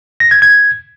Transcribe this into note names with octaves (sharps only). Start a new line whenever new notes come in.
A#6
G#6
G#6